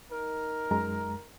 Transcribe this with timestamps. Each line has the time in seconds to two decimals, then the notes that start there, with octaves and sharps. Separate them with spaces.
0.11 D#4 A#4
0.71 F#2 G#3 A#5